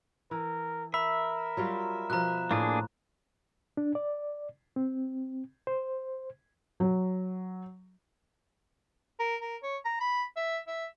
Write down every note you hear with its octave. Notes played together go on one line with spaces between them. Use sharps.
E3 A#4
A#4 E5 B5
F#3 G3 F4
B2 F3 A#5 F#6
A2 A#3 D4 G#4
D4
D5
C4
C5
F#3
A#4
A#4
C#5
A#5
B5
E5
E5